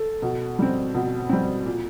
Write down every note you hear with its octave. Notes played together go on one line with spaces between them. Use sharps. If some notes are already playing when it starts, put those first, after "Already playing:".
Already playing: A4
B2
G3 C4
B2
G3 C4
A#2